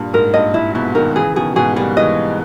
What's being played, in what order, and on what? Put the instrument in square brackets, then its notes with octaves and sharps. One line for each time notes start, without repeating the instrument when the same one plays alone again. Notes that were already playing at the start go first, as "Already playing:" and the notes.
Already playing: [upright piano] G2 A#2
[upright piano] G#2 [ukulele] A#4
[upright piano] G2 A#2 [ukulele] D#5
[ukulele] E4
[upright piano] G#2 B2 [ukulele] E4
[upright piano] B2 D#3 [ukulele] A#4
[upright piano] C#3 E3 [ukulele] G#4
[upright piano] B2 D#3 [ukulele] G#4
[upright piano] G#2 B2 [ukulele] G#4
[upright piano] G3 A#3 [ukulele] G#4
[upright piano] E3 G#3 [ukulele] D#5